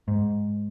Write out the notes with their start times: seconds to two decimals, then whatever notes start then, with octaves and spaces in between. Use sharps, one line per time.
0.08 G#2